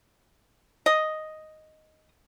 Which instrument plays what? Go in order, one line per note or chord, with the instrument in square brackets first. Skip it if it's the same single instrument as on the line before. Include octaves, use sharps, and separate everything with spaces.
[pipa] D#5